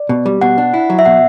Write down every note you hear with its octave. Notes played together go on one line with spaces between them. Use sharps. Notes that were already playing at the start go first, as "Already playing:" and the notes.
Already playing: D5
B2
G3
B2 F#5
D4
E4
F#3
E5
B2 F#5